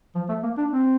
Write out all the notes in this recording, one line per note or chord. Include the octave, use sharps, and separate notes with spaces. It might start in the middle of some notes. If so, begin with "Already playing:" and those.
F3
A3
A#3
D4
C4